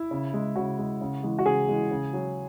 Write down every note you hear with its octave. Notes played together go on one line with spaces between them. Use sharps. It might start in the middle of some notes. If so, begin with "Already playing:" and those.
Already playing: E4
C#3
G#3
C#3 F#4
G#3
C#3
E3 G#3
F#4
C#3 G#4
E3 G#3
C#3
F#3